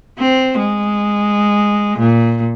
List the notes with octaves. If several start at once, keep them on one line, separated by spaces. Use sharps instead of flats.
C4
G#3
A#2